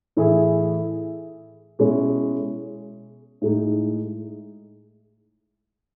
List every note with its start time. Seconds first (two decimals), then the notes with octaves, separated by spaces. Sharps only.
0.17 A2 E3 A3 E4 G#4
1.79 B2 G#3 C#4 E4
3.42 A2 G#3 D#4